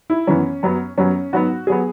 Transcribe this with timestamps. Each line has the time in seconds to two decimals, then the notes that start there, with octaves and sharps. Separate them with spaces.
0.10 E4
0.27 F#2 E3 B3 C#4
0.63 F#2 F#3 B3
0.98 F#2 F#3 B3 C#4
1.33 G#2 F#3 B3 F#4
1.67 F#3 B3 G#4